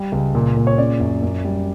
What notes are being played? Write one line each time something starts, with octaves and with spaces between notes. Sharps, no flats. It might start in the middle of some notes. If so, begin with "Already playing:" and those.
Already playing: G3
C#2
A#2
A#2
C#5
C#3 D5
F#2
F#2
G3